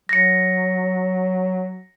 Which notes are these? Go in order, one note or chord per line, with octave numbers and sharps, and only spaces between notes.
F#3 A#6 C#7